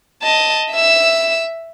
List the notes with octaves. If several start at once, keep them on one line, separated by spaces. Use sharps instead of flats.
D#5 A5
E5 E6